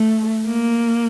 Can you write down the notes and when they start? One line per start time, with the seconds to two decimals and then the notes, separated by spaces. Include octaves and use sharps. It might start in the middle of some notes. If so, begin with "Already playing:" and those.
Already playing: A3
0.47 A#3